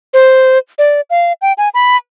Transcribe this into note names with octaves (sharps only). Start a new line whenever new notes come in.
C5
D5
F5
G5
G#5
B5